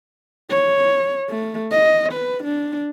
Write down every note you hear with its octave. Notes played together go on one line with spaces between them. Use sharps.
C#5
A3
D#5
B4
D4